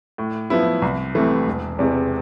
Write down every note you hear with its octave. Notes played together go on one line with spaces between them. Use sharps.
A2
F3 B3 E4
C2
C3 E3 A3
E1
E2 C3 G#3